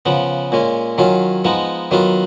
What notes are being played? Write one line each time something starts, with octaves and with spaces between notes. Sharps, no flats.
C#3 F3 B3
A#2 G#3 C#4
D#3 F#3 C#4 F4
F3 G#3 B3 D#4
D#3 F#3 B3 F4